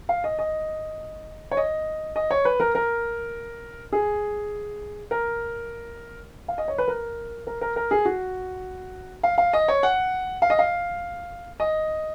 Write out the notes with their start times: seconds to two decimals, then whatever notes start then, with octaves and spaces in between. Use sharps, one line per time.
0.09 F5
0.24 D#5
0.39 D#5
1.51 C#5
1.57 D#5
2.16 D#5
2.31 C#5
2.45 B4
2.60 A#4
2.75 A#4
3.93 G#4
5.11 A#4
6.48 F5
6.58 D#5
6.68 C#5
6.78 B4
6.88 A#4
7.47 A#4
7.61 A#4
7.76 A#4
7.91 G#4
8.05 F#4
9.23 F5
9.38 F5
9.53 D#5
9.68 C#5
9.83 F#5
10.42 F5
10.50 D#5
10.59 F5
11.60 D#5